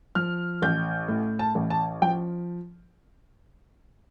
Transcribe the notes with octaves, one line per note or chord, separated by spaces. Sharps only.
F3 F6
A1 G6
A2
A5
A1
A5
F3 G5